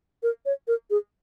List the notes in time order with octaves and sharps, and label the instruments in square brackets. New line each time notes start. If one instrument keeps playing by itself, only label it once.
[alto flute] A#4
C#5
A#4
G#4